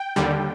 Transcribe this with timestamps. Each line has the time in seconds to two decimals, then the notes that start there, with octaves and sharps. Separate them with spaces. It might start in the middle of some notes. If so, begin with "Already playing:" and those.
Already playing: G5
0.16 D#2 D3 G3